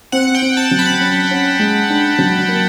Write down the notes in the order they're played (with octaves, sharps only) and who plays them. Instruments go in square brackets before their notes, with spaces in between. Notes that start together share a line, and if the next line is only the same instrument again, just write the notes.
[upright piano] C4 [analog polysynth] F#5
[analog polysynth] G5
[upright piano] C4
[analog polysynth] A5
[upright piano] F#3
[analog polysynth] B5
[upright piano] C#4
C#4
G#3
D4
F#3
A#3